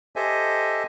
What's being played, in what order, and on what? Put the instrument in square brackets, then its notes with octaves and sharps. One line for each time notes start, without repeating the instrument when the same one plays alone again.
[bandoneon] G4 A4 C5 D#5 E5 G#5